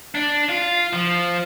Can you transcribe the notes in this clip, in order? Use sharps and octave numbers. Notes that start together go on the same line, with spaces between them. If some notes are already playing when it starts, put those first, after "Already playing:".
D4
F4
F3